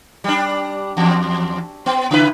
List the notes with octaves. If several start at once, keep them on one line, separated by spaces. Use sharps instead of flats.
G3 D4
E2
B3
C#3 E4 B4